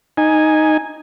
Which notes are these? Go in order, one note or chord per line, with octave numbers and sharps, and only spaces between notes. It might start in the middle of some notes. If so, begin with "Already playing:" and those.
D#4 G#5